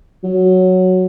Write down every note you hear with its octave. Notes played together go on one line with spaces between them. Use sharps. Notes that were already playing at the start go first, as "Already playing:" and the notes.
F#3